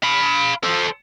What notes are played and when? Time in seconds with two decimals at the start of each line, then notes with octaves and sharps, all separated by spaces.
0.03 F5 B5
0.63 A4 C5